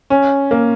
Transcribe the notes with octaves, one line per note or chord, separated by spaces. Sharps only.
C#4
A#3